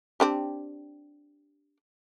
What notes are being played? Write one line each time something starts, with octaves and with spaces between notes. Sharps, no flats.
C4 D4 G4